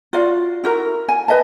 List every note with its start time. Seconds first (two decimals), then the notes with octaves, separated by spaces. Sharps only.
0.13 F4 F#4 D5 F5
0.64 E4 F#4 A#4
1.09 G#5
1.28 B4 D#5 E5 A5